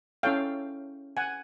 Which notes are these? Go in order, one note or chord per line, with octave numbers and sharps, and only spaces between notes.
C#4 E4 A4 C#5 F5 G5
F#5 G#5